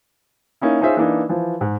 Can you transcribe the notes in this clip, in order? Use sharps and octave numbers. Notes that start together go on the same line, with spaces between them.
A#3 C#4 D#4 E4
C#4 D#4 F4 G#4 C5 E5
E3 A#3 D4 D#4
E3 F3
G#2